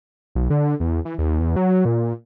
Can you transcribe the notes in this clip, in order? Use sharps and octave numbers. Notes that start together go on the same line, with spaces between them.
B1
D3
E2
E3
D#2
E2
F#3
A#2